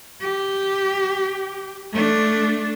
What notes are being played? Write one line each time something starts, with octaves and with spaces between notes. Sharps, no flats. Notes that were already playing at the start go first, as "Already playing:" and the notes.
G4
A3 D4